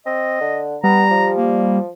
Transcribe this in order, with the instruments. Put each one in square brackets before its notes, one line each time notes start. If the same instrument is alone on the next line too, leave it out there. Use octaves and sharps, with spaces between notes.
[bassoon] C4 [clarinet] D#5
[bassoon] D3
[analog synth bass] G3 [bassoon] B3 [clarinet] A#5
[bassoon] F3
[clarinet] A#3